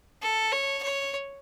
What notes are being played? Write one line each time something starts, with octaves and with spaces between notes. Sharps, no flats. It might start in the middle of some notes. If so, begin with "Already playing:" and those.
A4
C#5
C#5